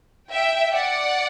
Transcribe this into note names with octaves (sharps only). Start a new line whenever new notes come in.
E5 G5
D5 F#5